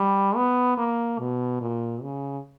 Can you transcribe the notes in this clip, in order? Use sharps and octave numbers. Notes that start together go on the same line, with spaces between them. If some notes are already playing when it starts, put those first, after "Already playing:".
Already playing: G3
B3
A#3
B2
A#2
C#3